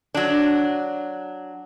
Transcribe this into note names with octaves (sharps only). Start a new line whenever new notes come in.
F#3 D4